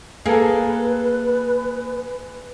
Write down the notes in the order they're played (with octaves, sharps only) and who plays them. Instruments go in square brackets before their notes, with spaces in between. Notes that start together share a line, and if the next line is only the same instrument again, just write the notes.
[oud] A#3 [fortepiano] G#4 A4 [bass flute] B4